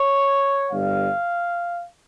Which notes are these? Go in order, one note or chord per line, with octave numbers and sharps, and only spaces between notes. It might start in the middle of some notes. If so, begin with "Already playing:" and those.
Already playing: C#5
G1 G2 G3 F5